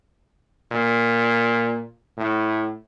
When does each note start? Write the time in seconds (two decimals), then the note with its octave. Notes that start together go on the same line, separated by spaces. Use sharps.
0.71 A#2
2.17 A2